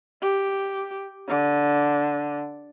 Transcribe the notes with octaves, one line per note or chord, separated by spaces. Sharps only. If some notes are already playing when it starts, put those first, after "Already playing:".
G4
D3